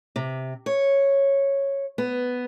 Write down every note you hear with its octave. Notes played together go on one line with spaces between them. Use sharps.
C3
C#5
B3